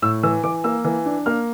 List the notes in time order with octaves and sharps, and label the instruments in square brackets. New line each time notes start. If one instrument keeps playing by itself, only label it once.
[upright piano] A2 E6
E3 E6
E3 D6
A#3 E6
E3
D4
A#3 F6